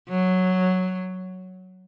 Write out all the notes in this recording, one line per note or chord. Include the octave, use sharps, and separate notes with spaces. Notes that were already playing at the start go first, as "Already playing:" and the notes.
F#3